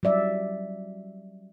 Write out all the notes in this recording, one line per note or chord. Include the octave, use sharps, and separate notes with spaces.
F#3 G3 D5 E5